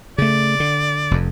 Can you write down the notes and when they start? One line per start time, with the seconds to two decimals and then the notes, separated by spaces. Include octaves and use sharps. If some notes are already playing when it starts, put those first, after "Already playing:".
0.18 C#3 A3 D5
0.60 D3
1.11 F1 F2